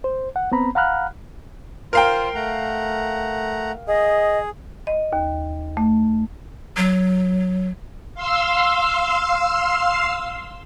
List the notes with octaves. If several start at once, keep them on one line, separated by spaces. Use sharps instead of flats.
C5
F#5
B3 C4 A#5 B5
F5 F#5 A#5 B5 F6 F#6
F4 A#4 C5 F5 G5
A3 F#5 A#5
G#4 D#5
D#5
D#2
A3
F#3
F5 C6 E6